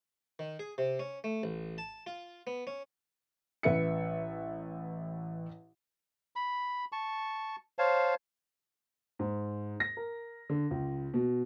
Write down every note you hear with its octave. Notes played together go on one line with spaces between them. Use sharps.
D#3
G#4
C3
C#4
A3
A1
A5
F4
B3
C#4
A1 B4 E5 C#7
B5
A5 C#6
C5 C#5 F5 A5
G#2
A#6
A#4
D3
C#2
B2